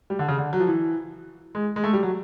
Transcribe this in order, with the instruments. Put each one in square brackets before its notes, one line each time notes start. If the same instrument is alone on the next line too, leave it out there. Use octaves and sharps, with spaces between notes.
[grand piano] G3
D3
C#3
D3
F#3
F3
E3
G#3
G#3
A3
G3
F#3